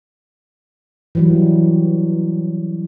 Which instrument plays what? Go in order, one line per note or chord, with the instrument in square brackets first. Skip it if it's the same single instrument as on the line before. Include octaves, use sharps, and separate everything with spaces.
[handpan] E3 F#3 G3